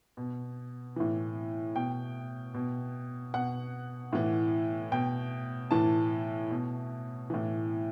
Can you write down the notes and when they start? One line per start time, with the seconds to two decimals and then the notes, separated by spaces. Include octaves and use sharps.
0.17 B2
0.96 A2 E3
1.75 B2 G5
2.54 B2
3.34 B2 F#5
4.13 A2 E3
4.92 B2 G5
5.71 A2 E3 A5
6.51 B2
7.30 A2 E3